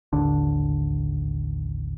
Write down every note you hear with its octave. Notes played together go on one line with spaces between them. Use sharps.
A1 D#2 D3 D4